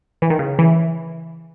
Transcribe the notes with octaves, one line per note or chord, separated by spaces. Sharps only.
E3
D#3
C#3
E3